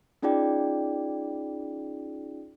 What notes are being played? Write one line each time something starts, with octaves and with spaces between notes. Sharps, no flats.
C#4 D#4 F4 G#4 D5 G5